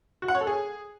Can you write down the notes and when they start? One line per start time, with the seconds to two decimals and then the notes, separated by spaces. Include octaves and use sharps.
0.22 F#4
0.28 F#5
0.35 C#5
0.41 A4
0.47 G#4